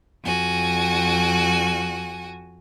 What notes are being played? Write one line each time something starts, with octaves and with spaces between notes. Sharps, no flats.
F2 F#4 G#5